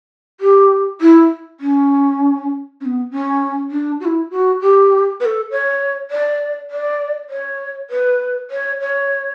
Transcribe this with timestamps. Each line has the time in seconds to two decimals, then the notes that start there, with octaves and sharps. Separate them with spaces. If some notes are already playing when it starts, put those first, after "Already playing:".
0.41 G4
1.01 E4
1.60 C#4
2.81 C#4
2.85 B3
3.11 C#4
3.71 D4
4.00 F#4
4.05 E4
4.31 F#4
4.61 G4
5.20 B4
5.25 A4
5.51 C#5
6.11 D5
6.71 D5
7.30 C#5
7.90 B4
8.51 C#5
8.80 C#5